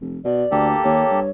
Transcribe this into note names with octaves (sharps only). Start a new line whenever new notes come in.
F1
B2 D5
D2 A#3 G4 A4
D#2 C#5
G2